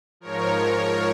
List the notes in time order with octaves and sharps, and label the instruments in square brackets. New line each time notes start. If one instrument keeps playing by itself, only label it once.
[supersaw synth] G#2 F3 A#4 C#5